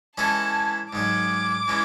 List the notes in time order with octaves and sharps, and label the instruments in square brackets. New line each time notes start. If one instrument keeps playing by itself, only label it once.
[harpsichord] E3 G#3 C#4 E4 A4 [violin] A5
[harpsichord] G#2 D#3 F#3 [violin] D6
[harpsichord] E3 G#3 C#4